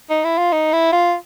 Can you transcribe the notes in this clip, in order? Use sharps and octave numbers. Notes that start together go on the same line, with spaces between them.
D#4
E4
F4
D#4
E4
F4